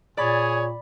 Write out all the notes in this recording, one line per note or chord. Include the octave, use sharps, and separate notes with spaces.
A#2 G#4 C#5 D5 B5 A6